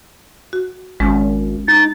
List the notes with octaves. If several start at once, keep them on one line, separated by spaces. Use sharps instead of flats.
F#4
G#1 G#3 C#4
D#4 A6